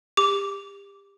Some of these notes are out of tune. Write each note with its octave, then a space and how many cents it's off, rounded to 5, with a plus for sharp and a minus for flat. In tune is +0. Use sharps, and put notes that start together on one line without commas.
G4 +30 D6 -15